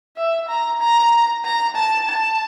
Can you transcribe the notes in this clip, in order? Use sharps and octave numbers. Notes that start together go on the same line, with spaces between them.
E5
A#5
A#5
A#5
A5
A5